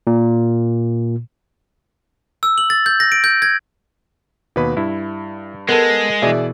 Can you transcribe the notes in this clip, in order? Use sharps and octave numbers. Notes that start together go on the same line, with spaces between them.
A#2
E6
F#7
A6
G6
A#6
D7
G6
G#6
D#2 B2 B4 B5
G2 E4
G#3 B3 A4 A#4
B2 E3 G#4 D5 E5